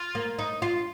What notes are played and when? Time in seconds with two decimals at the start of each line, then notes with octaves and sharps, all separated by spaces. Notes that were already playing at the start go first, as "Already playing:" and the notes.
Already playing: F4
0.15 A#3
0.39 D#4
0.62 F4